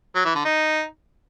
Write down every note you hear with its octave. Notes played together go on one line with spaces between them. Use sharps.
F#3
E3
D3
D#4